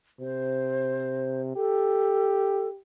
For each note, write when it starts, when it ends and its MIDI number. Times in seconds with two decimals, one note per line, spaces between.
0.20 1.51 48
0.20 1.42 72
1.56 2.79 67
1.56 2.69 69